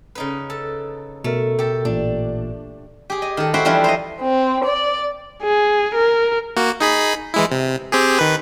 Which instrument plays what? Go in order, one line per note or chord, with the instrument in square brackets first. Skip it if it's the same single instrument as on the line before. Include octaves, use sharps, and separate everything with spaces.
[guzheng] C#3 D#4 B4
A4
[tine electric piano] B2 A#4 [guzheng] A3
[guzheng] G4 A4
[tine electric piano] A1 A#2 [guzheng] D4
[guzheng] G4 G#4
D#5
D#3 A4
E4 F#4 C5 E5 G5
E3 F3 G3 D4 E4 F4
C5 D#5
[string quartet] C4
D5
[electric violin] G#4
A#4
[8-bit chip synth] A#3 F#4
D#4 G#4 B5
E3 G#3 E4
C3
C4 G4 G#4
D#3 B4